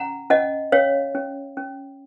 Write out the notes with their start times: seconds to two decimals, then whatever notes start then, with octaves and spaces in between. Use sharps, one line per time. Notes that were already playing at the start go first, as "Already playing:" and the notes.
Already playing: C#4 F#5 A#5
0.30 C#4 D#5 F#5
0.72 C#4 C#5 F5
1.15 C#4
1.57 C#4